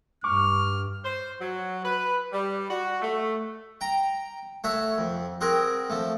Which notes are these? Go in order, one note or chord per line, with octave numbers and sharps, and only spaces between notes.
G2 C#6 D6 F6
C5
F#3
B4
G3
F#4
A3
G5 A#5
A3 F#4 C#5 E5
F2
C4 F#4 G#4 A#4
F3 A3